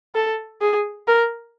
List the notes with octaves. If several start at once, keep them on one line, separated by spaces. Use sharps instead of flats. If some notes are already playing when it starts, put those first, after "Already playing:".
A4
G#4
A#4